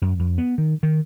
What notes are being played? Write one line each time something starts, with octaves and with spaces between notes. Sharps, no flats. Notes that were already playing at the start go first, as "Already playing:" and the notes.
F#2
F2
B3
D#3
D#3